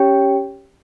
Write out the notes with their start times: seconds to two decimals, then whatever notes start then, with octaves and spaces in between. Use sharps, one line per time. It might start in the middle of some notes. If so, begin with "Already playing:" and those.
Already playing: C#4 G4 C#5 G5